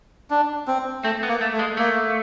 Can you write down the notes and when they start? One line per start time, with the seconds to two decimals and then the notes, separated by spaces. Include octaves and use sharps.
0.30 D4
0.67 C4
1.04 A3 C4
1.23 B3
1.29 A#3
1.41 A3
1.53 A3
1.59 G#3
1.77 A3 A#3